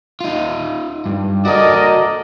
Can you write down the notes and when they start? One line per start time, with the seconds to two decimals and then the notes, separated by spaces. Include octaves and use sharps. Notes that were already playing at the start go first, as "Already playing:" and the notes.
0.21 D#4 F4
1.06 G2
1.45 F#4 A4 A#4 D5 D#5